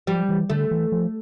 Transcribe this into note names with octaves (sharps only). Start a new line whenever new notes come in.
F3 G3
E3
D3 A3
E3
F3